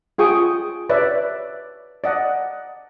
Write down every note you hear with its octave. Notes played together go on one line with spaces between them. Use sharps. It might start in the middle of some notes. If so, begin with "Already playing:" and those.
F4 G#4 G5 C#6 D#6
B4 C#5 D5 E5
D5 D#5 F#5